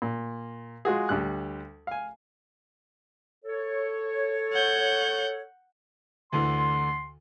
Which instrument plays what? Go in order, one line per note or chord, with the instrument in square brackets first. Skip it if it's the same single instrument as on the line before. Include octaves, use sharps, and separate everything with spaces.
[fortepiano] A#2
G#3 F4 F#4 G#4
D2 G3 F#6
F5 G#5
[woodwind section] A4 C#5
[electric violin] F#5 G6
[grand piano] D2 D3 E3 [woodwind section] C6